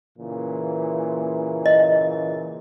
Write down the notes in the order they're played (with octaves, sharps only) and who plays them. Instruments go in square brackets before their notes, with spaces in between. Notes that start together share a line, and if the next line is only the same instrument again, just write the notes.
[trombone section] A#2 C#3 E3
[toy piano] D#5